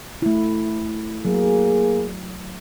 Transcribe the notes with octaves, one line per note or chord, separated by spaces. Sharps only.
A3 E4
F#3 A#3 G#4